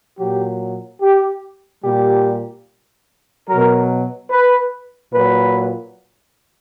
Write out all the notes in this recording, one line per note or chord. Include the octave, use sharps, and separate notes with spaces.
A#2 F#3 G4
G4
A#2 G3 G4
B2 F#3 A#4
B4
A#2 F#3 B4